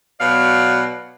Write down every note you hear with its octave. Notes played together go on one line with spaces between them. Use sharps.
B2 F#3 D5 F5